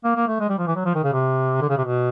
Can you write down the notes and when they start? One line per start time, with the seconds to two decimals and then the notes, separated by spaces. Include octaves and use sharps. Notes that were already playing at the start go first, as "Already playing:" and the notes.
0.04 A#3
0.15 A#3
0.27 A3
0.40 G#3
0.49 G3
0.58 F3
0.67 E3
0.76 F#3
0.85 F3
0.94 D#3
1.04 C#3
1.13 C3
1.61 D3
1.69 C#3
1.77 C3
1.85 B2